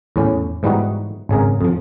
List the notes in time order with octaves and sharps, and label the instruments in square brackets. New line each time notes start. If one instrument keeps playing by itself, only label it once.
[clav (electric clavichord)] E2 A2 C#4
G#2 E3 G3 B3 D#4 F#4
G#1 C#3 G#4 A#4
F2 F3